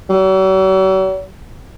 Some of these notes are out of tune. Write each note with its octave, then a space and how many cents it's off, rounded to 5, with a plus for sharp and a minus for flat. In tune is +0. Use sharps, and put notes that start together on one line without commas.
F#3 +45